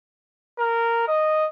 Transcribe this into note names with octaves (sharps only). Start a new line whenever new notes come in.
A#4
D#5